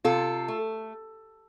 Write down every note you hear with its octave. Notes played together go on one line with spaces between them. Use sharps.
C3 F4 A4
A3